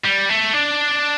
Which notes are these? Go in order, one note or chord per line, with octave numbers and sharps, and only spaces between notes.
G3
A3
D4